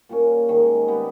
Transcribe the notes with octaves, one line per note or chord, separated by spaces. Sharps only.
A#2 G3 A#3 C#4
G#2 D#3 G#3
G3 B3 G4